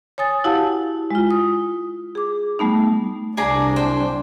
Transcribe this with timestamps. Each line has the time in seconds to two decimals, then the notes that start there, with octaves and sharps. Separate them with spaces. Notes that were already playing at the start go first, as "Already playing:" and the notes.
0.18 C#5 G#5 D#6 A6
0.44 E4 F#4 G4 F5 F#5 A5
1.11 G#3 F4
1.31 D#6
2.15 G#4 D6
2.59 G3 A3 B3 D#4
3.37 C2 D4 G#4 D5 A#5
3.76 C5 G5